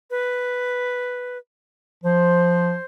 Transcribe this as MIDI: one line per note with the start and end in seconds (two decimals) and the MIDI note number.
0.10 1.38 71
2.04 2.75 53
2.04 2.86 72